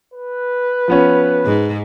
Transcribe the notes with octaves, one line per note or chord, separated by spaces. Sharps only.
B4
F3 B3 C#4
G#2